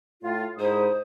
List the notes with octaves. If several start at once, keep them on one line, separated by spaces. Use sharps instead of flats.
A2 F4
C2 G#2 E4 C5 D#6